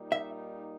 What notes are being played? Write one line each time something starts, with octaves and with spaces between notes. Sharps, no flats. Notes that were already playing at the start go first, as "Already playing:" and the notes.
Already playing: A#2 G3 A#3 D#4
E5